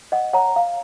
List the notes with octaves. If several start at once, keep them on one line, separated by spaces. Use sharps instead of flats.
D#5 F#5
C#5 F#5 A#5
F5